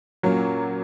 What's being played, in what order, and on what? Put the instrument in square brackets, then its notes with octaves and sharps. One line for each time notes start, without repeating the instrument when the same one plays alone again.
[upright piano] A#2 A#3 C#4 [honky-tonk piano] F#3